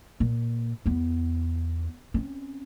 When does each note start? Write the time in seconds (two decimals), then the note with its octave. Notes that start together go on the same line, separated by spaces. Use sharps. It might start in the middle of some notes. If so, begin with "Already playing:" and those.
0.20 A#2
0.86 E2 B3
2.14 C4 C#4